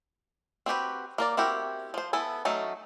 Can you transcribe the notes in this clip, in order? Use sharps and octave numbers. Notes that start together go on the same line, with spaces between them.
C4 F#4 G4 B4
A#3 A#4 D5
C4 E4 F#4 G4 A#4
F3 C5
B3 E4 A4 G#5
F#3 A3 C#4 D#4